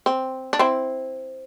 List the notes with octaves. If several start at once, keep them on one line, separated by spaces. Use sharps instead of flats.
C4
D4
C4 E4